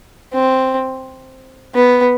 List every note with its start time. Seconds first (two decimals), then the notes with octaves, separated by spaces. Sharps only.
0.33 C4
1.75 B3